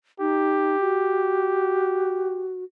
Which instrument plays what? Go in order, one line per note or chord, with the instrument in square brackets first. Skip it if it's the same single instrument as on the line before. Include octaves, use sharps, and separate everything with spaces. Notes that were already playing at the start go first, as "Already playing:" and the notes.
[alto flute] D#4 [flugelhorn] G4
[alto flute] F#4